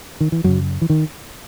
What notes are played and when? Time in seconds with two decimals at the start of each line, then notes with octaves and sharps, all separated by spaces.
0.20 D#3
0.32 E3
0.44 F#2 C#3 F#3
0.81 E3
0.90 D#3